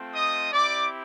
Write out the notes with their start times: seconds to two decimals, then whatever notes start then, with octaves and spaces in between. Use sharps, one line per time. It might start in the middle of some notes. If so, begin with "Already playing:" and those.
Already playing: A3 C4 F4
0.13 D#5 D#6
0.53 C4 E4 G4 D5 D6